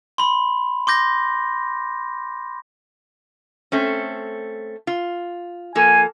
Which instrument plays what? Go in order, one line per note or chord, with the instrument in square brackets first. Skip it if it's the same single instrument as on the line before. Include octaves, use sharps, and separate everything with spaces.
[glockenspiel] B5 C6
C6 D6 G6 A#6
[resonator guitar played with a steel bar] A3 C4 C#4
F4
[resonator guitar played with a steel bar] F3 A#3 A4 [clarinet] G#5